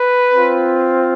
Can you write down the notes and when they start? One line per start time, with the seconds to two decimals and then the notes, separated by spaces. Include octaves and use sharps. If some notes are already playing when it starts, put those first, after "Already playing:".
Already playing: B4
0.34 C4 F4